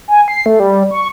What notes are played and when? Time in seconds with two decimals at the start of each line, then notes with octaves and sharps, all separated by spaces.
0.08 G#5
0.28 C7
0.46 A3
0.60 G3
0.91 C#6